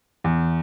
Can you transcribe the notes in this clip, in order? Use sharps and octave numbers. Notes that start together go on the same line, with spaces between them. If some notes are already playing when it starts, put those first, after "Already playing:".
E2